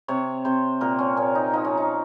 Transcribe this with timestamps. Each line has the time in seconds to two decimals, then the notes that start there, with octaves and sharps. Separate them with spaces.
0.08 C3 C#5
0.45 C3 C5
0.81 A#2 A#4
0.99 C#4
1.17 A#2 C#4
1.35 D#4
1.53 F3 D#4
1.65 C#4
1.77 D#4